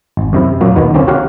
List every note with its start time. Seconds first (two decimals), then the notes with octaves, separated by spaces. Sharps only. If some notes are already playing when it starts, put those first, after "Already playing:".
0.17 G#1
0.33 F#2 C3 E4
0.61 F#2 A#2 F#3 A#3
0.76 D#2 B2 D#3 B3
0.94 C2 D3 A#3 C4 C#4
1.08 F#4 G4 A#4 C#5 F5 F#5